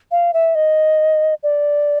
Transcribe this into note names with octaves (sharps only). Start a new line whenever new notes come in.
F5
E5
D#5
D5